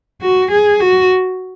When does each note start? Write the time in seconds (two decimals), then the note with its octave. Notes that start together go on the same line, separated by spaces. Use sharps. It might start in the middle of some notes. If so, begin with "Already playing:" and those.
0.22 F#4
0.51 G#4
0.80 F#4